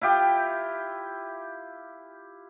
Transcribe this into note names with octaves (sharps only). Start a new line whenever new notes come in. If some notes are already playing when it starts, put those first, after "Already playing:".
E4 F4 G4 G5